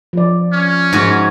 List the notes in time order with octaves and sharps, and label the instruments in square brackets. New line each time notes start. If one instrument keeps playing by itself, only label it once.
[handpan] F3 D5
[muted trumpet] C#4
[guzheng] G#2 F#4